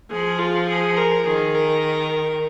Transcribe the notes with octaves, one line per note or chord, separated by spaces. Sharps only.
F3 G#4
F4
G#4
A#4
D#3 G#4
A#4